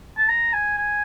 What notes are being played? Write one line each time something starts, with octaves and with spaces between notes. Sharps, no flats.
A5
A#5
G#5
G#5